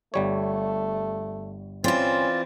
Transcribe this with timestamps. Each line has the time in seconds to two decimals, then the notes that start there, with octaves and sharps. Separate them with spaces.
0.14 G1 G3 A3 C#5
1.84 E3 C4 C#4 F4 D5